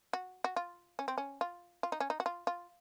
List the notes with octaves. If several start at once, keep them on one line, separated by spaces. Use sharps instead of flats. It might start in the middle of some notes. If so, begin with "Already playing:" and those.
F#4
F#4
F4
C#4
C4
C#4
F4
F4
D#4
C#4
D#4
F#4
F4
F4